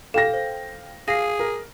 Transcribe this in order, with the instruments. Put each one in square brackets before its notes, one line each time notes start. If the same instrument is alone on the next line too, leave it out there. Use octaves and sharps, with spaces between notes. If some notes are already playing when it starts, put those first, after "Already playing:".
[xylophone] A4 [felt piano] F5 G5 A#6
[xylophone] C5
[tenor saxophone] G#4 [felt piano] F5 [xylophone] A#6 C7
[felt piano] A#4